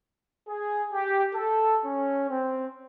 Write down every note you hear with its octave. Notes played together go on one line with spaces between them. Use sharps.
G#4
G4
A4
C#4
C4